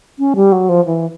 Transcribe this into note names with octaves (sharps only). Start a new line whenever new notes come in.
C#4
G3
F#3
F3
E3